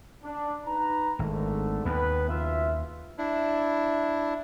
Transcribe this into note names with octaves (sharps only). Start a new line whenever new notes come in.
D4
D#4 B4 A#5
G#1 G#2 D3 A3
D#2 B3 B4
F#1 F4 E5
D4 E4